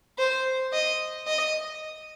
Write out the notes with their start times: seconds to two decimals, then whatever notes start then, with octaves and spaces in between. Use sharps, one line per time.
0.18 C5
0.73 D#5
1.27 D#5